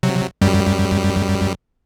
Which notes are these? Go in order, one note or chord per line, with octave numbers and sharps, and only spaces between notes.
C3 F#3
F#2 G3